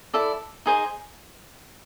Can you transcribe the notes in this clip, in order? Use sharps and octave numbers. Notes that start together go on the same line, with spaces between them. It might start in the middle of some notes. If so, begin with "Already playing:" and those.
E4 A4 D5
D#4 G#4 C5 D#5